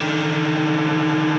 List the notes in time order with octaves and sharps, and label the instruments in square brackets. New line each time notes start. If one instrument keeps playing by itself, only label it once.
[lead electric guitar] D3 D#3